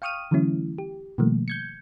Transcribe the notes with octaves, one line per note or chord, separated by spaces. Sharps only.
F5 G5 C#6 D#6 F6 D#7
D3 E3 F#3 A3 C#4 E4
G4
B2 D#3 F3 G3 A3 A#3
G6 G#6 C#7